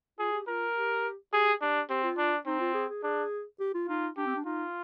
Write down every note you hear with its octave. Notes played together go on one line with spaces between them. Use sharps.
F4 G#4
G4
F4 A#4
G4
G4 G#4
D4 G4
C4 G4
F4
D4
C4 D#4
F4
G#4
G#4
D4 G#4
G4
F4
D#4 F4
D4 G4
C4
D4
D#4 F4